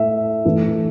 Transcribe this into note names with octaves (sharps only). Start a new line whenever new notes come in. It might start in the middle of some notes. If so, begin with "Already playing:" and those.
Already playing: A2 A3 E5
A2 E3 A3